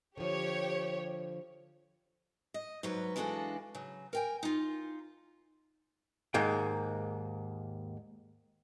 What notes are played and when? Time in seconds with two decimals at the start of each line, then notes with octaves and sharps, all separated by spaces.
0.18 D3 F3 G4 C#5
2.54 D#5
2.83 G#2 F#3 B4
3.16 E3 G#3 D4 F#4 A4 F5
3.75 C#3 F#3
4.13 A#4 G5 G#5
4.43 D#4 F4
6.34 D#2 G#2 A#3 G5